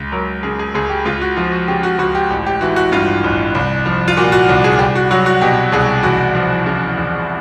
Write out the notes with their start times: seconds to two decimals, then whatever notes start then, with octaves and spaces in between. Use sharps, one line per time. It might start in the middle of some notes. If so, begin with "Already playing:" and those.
Already playing: C#2
0.12 F#3 A#4
0.43 C#3 G#4
0.59 G#4
0.74 C#2 G#4
0.90 G4
1.05 C#2 F4
1.22 F#4
1.36 F3 F4
1.52 F#4
1.68 C#3 G4
1.83 F#4
1.99 C#2 F#4
2.15 G4
2.30 A1 G4
2.46 G4
2.61 E3 F#4
2.76 F#4
2.92 G2 F4
3.24 A1
3.55 C2
3.86 F3
4.08 F4
4.17 A#2 F#4
4.32 F#4
4.49 C2
4.64 G#4
4.79 C2 G4
4.95 F#4
5.11 F#3 F#4
5.26 F#4
5.41 B2 G4
5.72 C2 G#4
6.03 E2 F#4
6.35 F3
6.66 C#3
6.98 E2